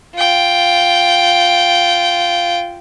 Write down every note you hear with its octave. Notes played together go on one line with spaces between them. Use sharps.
F4 G5